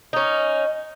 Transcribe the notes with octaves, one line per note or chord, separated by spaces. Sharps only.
C#4 D#4